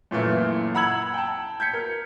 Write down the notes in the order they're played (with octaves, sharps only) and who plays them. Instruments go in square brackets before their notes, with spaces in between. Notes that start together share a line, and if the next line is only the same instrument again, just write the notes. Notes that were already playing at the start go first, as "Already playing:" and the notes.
[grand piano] F#2 A#2 E3 A3 A#3
F#5 A#5 B5 E6 G#6 F#7
G5 A5
G6 G#6 B6 C#7
A#4